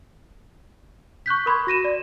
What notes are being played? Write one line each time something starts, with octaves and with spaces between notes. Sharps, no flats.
C#6 F#6 G6 B6
A#4 B5 C6 G#6
F#4 A#6 D#7 E7
D5